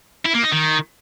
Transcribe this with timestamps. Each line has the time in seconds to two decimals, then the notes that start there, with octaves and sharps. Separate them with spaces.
0.25 E4
0.34 A#3
0.43 D#4
0.52 D#3